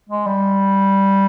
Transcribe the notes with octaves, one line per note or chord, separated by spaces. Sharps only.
G#3
G3